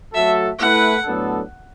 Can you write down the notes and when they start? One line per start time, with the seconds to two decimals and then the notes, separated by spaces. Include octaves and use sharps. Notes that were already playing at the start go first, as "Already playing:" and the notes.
0.13 F#3 A3 F#4 A4 E5
0.59 A3 E4 B4 F#5
1.04 A2 F#3 B3 D4 A4